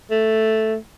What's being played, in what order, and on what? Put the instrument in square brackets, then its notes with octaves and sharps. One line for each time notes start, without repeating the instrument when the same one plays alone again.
[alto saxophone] A3